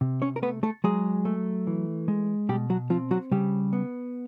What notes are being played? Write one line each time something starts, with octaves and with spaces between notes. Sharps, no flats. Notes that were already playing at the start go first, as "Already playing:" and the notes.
C3
C#4 C#5
A#4
A3 B3 B4
A3 A4
F#3 G#3 G#4
A3
E3
G#3
B2 G3 G4
F#3 F#4
F3 C4 F4
F#3 F#4
C#3 G3 G4
B3